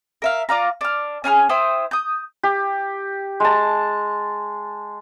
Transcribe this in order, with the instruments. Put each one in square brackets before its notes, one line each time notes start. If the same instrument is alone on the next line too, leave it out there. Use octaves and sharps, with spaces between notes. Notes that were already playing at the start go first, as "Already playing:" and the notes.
[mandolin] A#4 E5 F5
F4 D5 F5 A#5
D4 F6
C#4 G#4 C6 F6
E4 C5 G5 D#6
D#6 G6
[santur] G4
G#3 A5